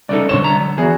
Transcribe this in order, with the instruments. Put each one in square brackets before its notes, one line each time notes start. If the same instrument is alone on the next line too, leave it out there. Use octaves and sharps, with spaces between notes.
[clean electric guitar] C2 C#3 D#4 [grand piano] A4 D5
[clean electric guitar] G2 C5 C#5 [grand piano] D3 C#6 E7
[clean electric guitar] C2 A#5
F#3
[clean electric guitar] E3 B3 [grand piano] F#4 G#4